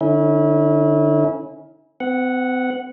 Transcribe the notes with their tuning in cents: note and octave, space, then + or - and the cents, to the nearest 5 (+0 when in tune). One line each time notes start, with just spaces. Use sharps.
D3 +15 C#4 +0 E4 -35
C4 -45 F#5 -5